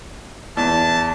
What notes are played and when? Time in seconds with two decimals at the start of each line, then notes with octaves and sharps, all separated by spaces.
0.57 E2 A5